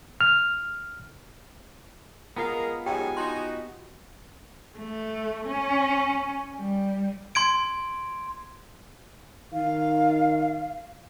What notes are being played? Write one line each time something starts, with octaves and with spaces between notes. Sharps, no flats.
F6
G#3 B3 F4 G#4 A#4 F5 A#5
G#2 F#3 G#3 G4 G5 G#5
D#4 F#4 C6
A3
C#4
G3
C6 G#6 D7
D#3 F5